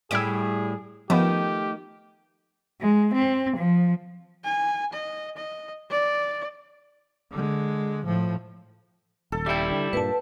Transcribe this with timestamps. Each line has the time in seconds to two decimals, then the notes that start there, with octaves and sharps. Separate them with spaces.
0.11 A2 G3 E4 G#4 E6 G#6 D7
1.10 D#3 F3 A3 B3 G4
2.81 G#3
3.15 C4
3.58 F3
4.44 G#5
4.93 D#5
5.37 D#5
5.90 D5
7.32 D3 G#3
8.06 A2 F3
9.32 D#1 A4
9.46 G3 E4 E5 G5
9.71 D3
9.93 G2 A#2 B4 A5